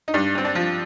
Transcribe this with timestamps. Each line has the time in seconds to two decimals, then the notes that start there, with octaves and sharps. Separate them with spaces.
0.08 D#4
0.14 G2 D4
0.35 G2 C4
0.45 D4
0.55 F3